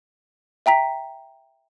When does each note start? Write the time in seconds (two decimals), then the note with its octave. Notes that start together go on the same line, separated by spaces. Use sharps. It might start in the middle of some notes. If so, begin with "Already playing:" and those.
0.66 E5 G5 A#5 B6